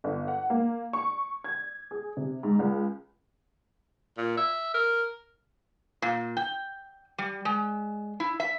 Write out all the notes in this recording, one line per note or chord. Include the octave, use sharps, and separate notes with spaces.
G1
F#5
A#3
C#6
G#6
G#4
C3
G#2
C#2
A#2
E5
A#4
A#2
G5
G3
G#3
E4
E5